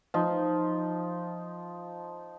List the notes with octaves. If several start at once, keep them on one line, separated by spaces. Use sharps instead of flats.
F3 D#4